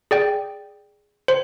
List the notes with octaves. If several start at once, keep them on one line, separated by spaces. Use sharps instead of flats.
G#4 D5 G5
C5